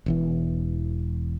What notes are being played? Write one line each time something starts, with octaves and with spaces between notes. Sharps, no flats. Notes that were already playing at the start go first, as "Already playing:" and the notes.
E1 E2 E3